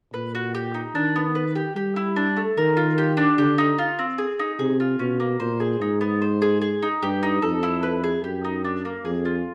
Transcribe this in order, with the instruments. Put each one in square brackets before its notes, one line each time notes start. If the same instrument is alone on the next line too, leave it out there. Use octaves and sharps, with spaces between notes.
[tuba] A#2 [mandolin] B4
[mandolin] F#4
G4
D#4
[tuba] D#3 [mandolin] D4
[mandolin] B3
B4
G4
[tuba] G3 [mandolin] G4
[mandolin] E4
D4
A3
[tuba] D#3 [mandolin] A#4
[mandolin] F4
G4
D4
[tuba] D3 [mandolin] G4
[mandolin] D#4
F4
C4
G#4
D#4
[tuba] C3 [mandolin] G#4
[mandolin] F4
[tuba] B2 [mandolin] C#4
[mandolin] A#3
[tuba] A#2 [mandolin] C5
[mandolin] G#4
[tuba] G#2 [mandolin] D#4
[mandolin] B3
C5
G#4
G#4
D#4
[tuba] G2 [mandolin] G4
[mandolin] D#4
[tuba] F2 [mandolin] A4
[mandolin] E4
B4
G#4
[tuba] F#2 [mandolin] G4
[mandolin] D#4
D4
A#3
[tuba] F2 [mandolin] G#4
[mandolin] F4